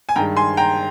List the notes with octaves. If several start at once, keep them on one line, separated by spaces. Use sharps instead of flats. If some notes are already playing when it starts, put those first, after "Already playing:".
G#5
G2 D#3 G#3 G5 A#5
G#5 C6
G5 A#5